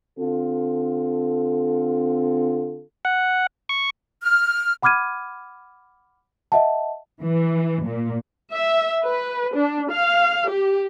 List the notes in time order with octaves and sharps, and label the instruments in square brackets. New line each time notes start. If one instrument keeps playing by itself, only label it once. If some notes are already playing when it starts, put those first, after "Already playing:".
[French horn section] D3 C4 F4 A4
[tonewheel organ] F#5
C#6
[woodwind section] F6
[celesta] F#5 B5 D6 F6 G#6 D#7
D#5 E5 F#5 A5
[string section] E3
A#2
[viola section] E5
B4
D4
F5
G4